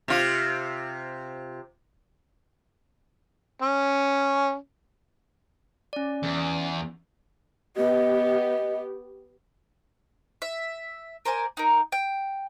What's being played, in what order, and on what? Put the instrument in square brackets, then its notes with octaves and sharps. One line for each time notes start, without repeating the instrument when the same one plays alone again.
[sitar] C3 F4
[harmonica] C#4
[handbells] C#4 D5
[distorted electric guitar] E2
[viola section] B3 G4 [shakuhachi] D#5
[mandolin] E5
A#4 C5 D5 G#5
D#4 A#4
G5